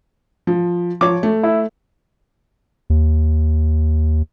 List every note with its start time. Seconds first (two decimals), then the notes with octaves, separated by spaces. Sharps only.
0.47 F3
1.01 F3 C#5 D6
1.23 A3
1.43 E4
2.90 D#2